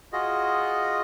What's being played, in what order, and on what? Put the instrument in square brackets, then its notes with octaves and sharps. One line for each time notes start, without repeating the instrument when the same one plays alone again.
[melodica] F4 F#4 G#4 D#5